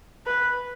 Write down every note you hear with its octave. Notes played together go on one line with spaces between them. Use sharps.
B4